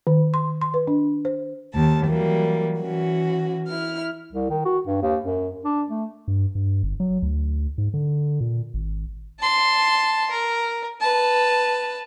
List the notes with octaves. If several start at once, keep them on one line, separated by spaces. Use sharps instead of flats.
D#3
C6
C6
B4
D4
C5
D#2 A5
E3 F#3 G3 A#3
E3 C#4 F#4
E4 F6
C2
D#3
F#4
G2
D#2
F#2
D4
A3
G2
G2
G1
F#3
D2
G#2
D3
A#2
G#1
A5 C6
A#4
B4 A5